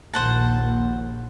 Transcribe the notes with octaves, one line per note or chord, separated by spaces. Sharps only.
A#1 D#2 C5 F#5 A5